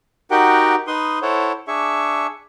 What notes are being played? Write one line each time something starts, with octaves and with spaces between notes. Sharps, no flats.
D#4 F#4 G4 A#4 F#5 G5
D#4 B4 C6 D#6
E4 A4 C5 C#5 F#5
D4 G#4 E5 C#6